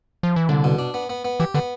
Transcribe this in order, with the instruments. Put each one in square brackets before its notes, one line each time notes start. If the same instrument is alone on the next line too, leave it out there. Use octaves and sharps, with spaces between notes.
[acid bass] F3
E3
[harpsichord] C2 [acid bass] D3
[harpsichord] B2
D4
B3
B3
B3
[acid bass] E3 [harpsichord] G4
[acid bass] D3 [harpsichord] B3